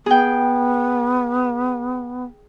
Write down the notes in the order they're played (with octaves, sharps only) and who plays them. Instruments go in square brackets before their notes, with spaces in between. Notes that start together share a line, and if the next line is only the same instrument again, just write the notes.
[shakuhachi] B3 [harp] G#4 G5